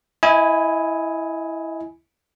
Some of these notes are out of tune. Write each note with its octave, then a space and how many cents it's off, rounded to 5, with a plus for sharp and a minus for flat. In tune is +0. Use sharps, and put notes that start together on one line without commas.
E4 +0 D#5 +30 G#5 +0